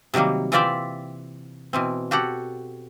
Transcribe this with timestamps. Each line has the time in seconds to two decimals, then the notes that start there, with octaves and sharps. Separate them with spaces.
0.14 C3 D#3 F#3 G3 A#3
0.52 E3 C4 F4 D5 E5 G5
1.73 B2 E3 C4
2.11 F#4 G4 A4 F#5